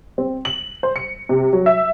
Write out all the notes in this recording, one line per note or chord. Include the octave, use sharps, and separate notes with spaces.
C4
F#7
C5
C#7
C3
F#3
E5